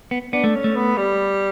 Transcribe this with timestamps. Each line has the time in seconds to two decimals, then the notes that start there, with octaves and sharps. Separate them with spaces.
0.11 B3
0.33 B3 D4
0.44 A3
0.55 C#4
0.64 A3
0.76 B3
0.97 G3